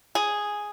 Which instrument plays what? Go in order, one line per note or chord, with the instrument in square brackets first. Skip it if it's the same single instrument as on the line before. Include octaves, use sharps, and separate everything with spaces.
[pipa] G#4